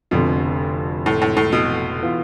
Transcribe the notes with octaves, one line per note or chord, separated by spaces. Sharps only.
F1 F2 B2 D3
A2
A2
A2
B2
E3 B3 F4